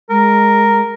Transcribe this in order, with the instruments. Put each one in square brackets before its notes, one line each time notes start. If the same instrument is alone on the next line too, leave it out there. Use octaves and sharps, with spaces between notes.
[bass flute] G#3 [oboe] A#4